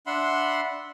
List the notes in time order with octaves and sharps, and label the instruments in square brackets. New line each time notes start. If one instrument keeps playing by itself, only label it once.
[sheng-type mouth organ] D4 E5 F#5 B5 C6